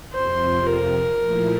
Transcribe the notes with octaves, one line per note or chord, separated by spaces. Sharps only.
F2 C3 F3 C5
A#4
A#2 F3 A3 E4